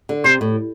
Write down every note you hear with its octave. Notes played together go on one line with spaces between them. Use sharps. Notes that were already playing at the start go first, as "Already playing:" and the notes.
D3
C3 C5
A2